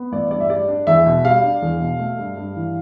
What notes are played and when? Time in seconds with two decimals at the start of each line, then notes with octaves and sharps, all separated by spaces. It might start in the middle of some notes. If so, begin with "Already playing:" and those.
Already playing: B3
0.12 A1 D5
0.31 G2 D5
0.40 E5
0.50 G3 D5
0.68 D4
0.87 E2 E5
1.06 B2
1.24 G3 F5
1.43 D4
1.62 E2
1.81 B2
1.99 A3
2.19 G2
2.37 G2
2.56 E3